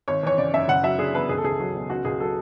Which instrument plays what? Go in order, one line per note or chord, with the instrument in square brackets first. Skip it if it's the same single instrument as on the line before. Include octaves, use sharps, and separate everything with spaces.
[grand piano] G#1 C#5
E3 C#5
C#3 D5
F#2 E5
F#1 F#5
F#3 E5
D3 G#4
E2 B4
C#2 G#4
A4
C#2 G#4
F#3
B2
C#2 F#4
C#2 G#4
F#3 A4